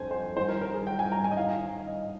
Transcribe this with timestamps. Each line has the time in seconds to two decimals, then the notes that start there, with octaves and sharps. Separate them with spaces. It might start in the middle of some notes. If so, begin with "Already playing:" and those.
Already playing: F2 D3 C5 G#5
0.11 C5
0.36 G2 D#3 C5
0.48 A#4
0.61 A#4
0.74 G#4
0.87 G5
0.99 G#5
1.12 A#5
1.24 G#5
1.31 D#5
1.37 G2 D#3 F5
1.87 D#5